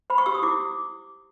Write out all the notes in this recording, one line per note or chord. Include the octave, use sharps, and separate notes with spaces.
C5 B5
C#6
G4 E6
D#6
E4 D6